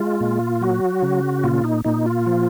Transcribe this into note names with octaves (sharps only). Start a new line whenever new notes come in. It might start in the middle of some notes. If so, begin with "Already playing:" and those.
Already playing: G#3 F4
A#2
F#3 F#4
C#3
A#2 F4
D#4
A#2 D#4
F4
F3